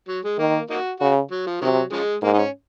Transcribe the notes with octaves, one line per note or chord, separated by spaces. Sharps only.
F#3
G#3
D#3 A#3
A#3 D#4 F#4
C#3 F#4
F#3
F3
C3 D#3 F#3
C#3 F3 G#3
G#2 A#3
D#4
C#4